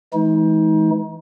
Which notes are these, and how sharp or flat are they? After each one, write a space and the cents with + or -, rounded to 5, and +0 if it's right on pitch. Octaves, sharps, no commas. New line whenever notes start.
E3 +0 G#3 +40 D#4 +30